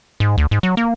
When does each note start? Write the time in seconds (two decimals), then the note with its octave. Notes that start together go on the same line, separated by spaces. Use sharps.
0.20 G#2
0.38 D2
0.51 G#2
0.63 F#3
0.77 A#3